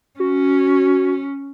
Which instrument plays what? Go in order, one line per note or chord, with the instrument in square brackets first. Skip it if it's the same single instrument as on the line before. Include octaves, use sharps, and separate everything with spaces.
[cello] C#4 [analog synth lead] F#4